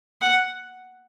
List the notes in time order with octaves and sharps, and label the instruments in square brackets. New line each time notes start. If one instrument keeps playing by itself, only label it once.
[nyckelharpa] F#5